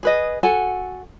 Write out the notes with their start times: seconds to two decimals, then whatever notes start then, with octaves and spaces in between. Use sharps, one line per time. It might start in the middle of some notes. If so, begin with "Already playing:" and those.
0.03 G#4 B4 D#5
0.43 F#4 A4 F#5 G#5